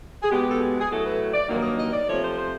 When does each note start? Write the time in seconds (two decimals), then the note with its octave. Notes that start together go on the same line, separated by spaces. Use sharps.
0.23 G#4
0.30 B2 G#3 B3 G4
0.50 A4
0.60 G#4
0.80 G#4
0.90 A2 F#3 A3 A4
1.04 B4
1.34 D5
1.48 G2 D#3 F#3 A#3
1.63 D#5
1.77 D#5
1.93 D5
2.07 C3 F3 A3 C#5
2.22 C5
2.37 C5